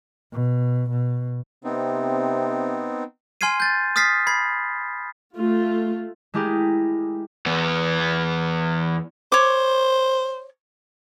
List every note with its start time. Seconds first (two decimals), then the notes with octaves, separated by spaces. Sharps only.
0.32 B2
0.90 B2
1.64 C3 B3 C4 D#4
3.41 G#5 C6 F6 G#6 C7 D#7
3.60 G6 A6
3.96 D#6 F6 A6 B6 C7
4.27 B5 G#6 C7
5.36 A3 F4
6.34 G#3 A3 E4 G4 G#4 A#4
7.46 E2 B3
9.32 C5 C#5 D6